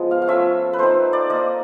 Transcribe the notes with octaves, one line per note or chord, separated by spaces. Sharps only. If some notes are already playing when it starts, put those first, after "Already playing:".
Already playing: F3 G#3 B3
F5
F5
F3 A3 C#4 F4 E5
B4
A3 C4 D#4 C5
D5
A#3 D#4 D#5